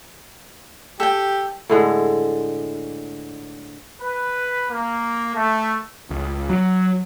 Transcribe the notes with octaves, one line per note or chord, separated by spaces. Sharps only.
G4 A4 G5
A2 D3 G#3
B4
A#3
A3
C#2
F#3